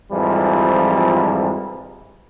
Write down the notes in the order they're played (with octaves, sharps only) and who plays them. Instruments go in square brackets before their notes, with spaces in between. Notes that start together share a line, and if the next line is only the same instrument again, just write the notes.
[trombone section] F2 G#2 E3 F3 G3